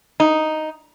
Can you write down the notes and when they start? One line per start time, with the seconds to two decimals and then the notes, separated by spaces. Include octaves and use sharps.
0.20 D#4